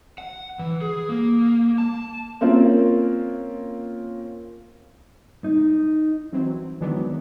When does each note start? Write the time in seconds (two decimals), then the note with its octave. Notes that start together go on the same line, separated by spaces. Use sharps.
0.18 F#5
0.59 E3
0.81 G#4
1.09 A#3
1.78 A5
2.41 A#3 C4 C#4 F4
5.44 D#4
6.32 E3 F#3 C4
6.81 D#3 E3 F#3 G#3 B3 D4